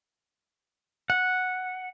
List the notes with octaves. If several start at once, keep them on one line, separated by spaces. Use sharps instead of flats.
F#5